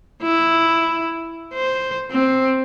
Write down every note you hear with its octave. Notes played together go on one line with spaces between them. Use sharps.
E4
C5
C4